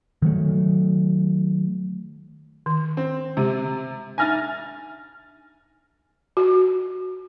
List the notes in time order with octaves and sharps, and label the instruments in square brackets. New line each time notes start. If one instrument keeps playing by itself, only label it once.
[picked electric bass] D#3 F#3 A3
[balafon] D#3
[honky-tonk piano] C4
[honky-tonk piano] C3 [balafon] G#3 G4
[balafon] D4 D#4 E5 [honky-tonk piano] G#5 F6 A6
[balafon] F#4